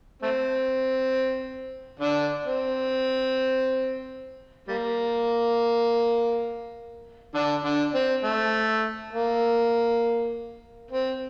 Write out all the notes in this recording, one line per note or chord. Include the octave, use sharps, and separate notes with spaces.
A3 C4
D3 D4
C4
G3 A#3
D3 D4
D3 D4
C4
A3
A#3
C4